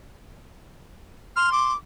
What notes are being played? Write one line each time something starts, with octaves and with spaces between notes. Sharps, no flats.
C6 F6
D6